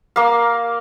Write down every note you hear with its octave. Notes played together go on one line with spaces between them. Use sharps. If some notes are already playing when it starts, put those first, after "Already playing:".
A#3 F5